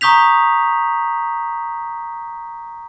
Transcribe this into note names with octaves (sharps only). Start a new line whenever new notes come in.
A#5 C#6 D#6 G6 B6 F7